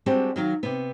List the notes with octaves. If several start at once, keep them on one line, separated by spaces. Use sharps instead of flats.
G3 G#3 C4 D4 F#4 G4
D#3 F#3 F5
C3 B3